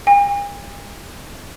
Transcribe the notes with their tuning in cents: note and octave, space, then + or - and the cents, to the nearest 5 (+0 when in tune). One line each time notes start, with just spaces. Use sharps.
G#5 -45